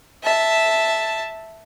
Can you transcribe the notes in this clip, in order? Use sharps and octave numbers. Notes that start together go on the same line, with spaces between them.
E5 A5